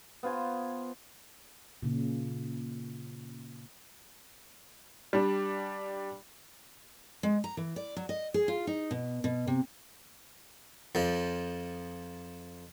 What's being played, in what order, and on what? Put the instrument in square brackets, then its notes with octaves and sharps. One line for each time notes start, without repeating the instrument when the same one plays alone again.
[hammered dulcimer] B3 F4 C5 G#5
[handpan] A#2 C#3
[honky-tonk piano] G3 D4
[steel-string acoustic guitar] G#3
A#5
E3
D5
F#3
D#5
G#4
F4
D#4
B2
B2
C3
[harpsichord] F2 F3